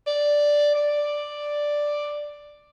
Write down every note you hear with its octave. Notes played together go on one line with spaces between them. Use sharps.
D5
D5